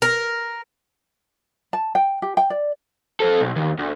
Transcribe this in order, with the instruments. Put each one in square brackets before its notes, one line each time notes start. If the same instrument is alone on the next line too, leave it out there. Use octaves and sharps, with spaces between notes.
[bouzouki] A#4
[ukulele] A5
G5
G4
G5
D5
[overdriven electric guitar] C4 A4
B1
D#2
D2